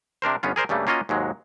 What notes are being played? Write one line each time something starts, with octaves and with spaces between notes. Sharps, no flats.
C3 D4 A#4 C5
G1 B3 C#4 F4
G#4 A#4 C5 D5
G2 C#3 G3 A3 A#3
A#3 C#4 F4 F#4 D#5
D#2 G#2 F#3 G#3